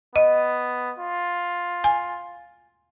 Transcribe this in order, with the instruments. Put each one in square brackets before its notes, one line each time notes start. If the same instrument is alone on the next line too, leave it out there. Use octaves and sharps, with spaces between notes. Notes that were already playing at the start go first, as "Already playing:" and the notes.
[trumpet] B3 [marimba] D#5
[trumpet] F4
[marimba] G#5